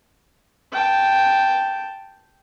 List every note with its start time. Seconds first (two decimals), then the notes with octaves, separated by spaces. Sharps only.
0.73 G5 A5